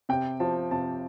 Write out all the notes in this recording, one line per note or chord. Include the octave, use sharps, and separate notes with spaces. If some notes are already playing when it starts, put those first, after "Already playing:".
C3 G5
F3 A5
C3 A5